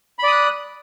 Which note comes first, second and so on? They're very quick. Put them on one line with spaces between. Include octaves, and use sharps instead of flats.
B5 D5 D#6 F#6